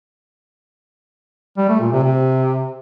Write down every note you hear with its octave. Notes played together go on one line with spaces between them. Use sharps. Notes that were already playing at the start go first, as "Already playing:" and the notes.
G3
A3
A#2
C3
C3